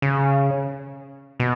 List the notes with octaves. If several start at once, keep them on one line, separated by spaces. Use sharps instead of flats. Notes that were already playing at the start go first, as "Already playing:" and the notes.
C#3
B2